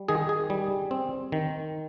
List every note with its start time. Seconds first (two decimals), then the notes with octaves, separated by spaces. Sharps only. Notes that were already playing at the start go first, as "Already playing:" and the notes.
Already playing: G3
0.09 D#3 G#4
0.29 G#4
0.50 G3
0.91 C4
1.32 D#3